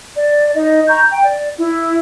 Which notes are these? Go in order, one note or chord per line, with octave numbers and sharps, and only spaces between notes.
D5
D#4 D#5
A#5 C#6 G6
G5
D5
E4